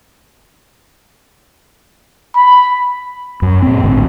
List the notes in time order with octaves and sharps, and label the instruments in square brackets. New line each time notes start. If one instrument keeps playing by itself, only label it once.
[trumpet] B5
[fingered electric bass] F#2
A#2 C4
A1 D2 G#2